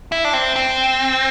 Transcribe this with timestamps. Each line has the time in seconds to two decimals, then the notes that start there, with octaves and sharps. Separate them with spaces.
0.12 E4
0.25 D4
0.33 C4
0.56 C4